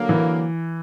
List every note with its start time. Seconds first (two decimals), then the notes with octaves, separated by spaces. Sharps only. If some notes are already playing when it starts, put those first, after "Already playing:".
Already playing: D3 F#3 A#3
0.09 E3